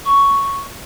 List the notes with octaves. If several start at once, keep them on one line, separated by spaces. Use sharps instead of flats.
C#6